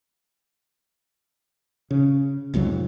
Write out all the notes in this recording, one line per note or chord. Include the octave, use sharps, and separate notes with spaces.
C#3
C2 F2 G#2 F#3